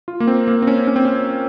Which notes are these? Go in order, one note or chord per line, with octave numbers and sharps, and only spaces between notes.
F4
A#3
C4
A#3
C4
C#4
C#4
C4
C#4